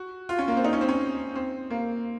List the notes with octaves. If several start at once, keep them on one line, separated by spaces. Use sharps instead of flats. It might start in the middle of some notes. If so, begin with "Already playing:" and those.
Already playing: F#4
F4
C#4
A#3
C4
D#4
C#4
C4
C#4
C4
A#3